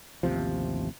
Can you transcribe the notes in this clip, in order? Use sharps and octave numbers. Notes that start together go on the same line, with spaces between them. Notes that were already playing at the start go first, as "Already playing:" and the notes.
A1 D#2 C3 F3